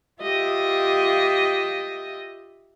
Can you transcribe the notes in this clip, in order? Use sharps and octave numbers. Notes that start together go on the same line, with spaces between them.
F4 G4 D#5 E5